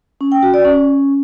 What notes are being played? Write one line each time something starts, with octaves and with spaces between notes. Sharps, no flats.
C#4
G5
F#4
D5
C#4